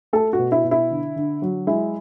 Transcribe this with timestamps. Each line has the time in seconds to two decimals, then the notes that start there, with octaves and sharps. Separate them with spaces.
0.13 A3 A4
0.33 F#4
0.39 B2
0.52 E4
0.64 B2
0.71 E4
0.91 D3
1.16 D3
1.42 F#3
1.67 G#3 E4